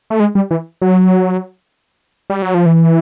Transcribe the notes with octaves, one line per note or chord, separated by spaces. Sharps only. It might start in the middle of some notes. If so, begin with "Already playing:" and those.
A3
G#3
G3
E3
F#3
G3
F#3
F3
E3